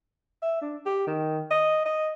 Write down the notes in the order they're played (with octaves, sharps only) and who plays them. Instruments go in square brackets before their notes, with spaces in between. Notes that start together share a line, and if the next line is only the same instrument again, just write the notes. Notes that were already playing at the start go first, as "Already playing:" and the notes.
[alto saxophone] E5
D4
G4
D#3
D#5
D#5